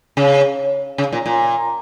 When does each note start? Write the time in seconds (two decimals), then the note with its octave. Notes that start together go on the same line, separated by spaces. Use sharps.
0.17 C#3
0.98 C#3
1.13 A#2
1.26 A#2